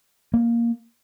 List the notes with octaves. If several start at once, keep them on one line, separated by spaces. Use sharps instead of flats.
A#3